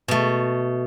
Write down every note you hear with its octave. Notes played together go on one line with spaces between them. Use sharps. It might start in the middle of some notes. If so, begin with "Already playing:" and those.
B2 A3